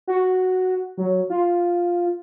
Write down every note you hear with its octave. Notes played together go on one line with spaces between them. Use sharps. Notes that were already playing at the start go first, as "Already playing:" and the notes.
F#4
F#3
F4